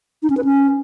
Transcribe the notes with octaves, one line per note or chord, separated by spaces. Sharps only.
D#4
C#4
B4
C#4